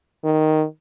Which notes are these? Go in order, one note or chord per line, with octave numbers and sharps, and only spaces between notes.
D#3